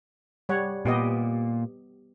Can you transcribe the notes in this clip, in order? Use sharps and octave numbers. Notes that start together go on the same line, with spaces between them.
G3 C#5 F#5
A#2 B3 G4 D#5